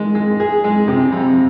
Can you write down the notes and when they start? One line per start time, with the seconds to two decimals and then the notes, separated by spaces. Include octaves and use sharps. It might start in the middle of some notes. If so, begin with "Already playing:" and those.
Already playing: D#3 G#3
0.15 G#3
0.40 G#4
0.64 G#3
0.88 C3
1.12 F2